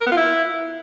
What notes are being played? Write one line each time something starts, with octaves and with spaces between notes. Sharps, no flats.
A#4
B3
F4
E4